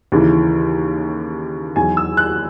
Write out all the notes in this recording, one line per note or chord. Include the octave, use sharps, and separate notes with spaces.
D#2 C#3 E3
E2 D#3 F#3 G#5
E6
F#6